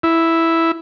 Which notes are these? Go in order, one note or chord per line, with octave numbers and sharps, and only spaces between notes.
E4